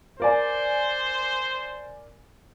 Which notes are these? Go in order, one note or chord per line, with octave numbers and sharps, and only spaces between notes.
A#4 C5 D5 G#5